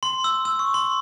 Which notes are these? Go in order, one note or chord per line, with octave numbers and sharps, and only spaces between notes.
C6
E6
E6
C#6
C6